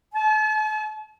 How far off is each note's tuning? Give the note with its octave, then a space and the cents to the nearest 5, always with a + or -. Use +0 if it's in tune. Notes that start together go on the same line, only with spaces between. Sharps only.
A5 -40